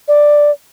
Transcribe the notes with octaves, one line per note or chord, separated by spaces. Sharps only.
D5